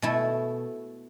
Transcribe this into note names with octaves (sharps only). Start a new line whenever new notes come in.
B2 A3 E4